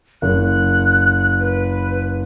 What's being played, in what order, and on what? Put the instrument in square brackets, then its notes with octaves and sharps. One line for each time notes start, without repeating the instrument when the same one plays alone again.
[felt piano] F#1 [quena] F#6
[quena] B4